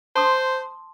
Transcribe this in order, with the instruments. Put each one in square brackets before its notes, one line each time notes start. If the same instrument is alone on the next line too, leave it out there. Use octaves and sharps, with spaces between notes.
[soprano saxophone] C5 [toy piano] A5 C6 D#6